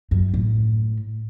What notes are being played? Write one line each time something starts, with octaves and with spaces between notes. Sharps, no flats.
F#2
A2